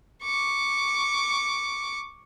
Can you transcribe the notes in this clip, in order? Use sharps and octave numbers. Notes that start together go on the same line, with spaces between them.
C#6 D6